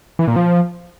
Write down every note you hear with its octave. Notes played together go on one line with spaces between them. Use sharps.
E3
A#2
F3